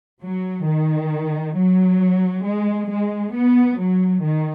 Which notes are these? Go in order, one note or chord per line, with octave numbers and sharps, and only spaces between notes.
F#3
D#3
F#3
G#3
G#3
B3
F#3
D#3